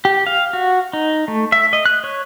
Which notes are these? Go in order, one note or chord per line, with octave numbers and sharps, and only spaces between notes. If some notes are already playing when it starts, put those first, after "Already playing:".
G4
F5
F#4
D#4
A3
E5
D#5
F#6
C#5